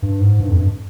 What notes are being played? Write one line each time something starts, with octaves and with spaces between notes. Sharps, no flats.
G2
G#2
G2
F2
G2